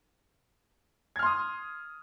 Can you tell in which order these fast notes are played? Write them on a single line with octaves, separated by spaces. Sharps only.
G#6 F6 C6 D#6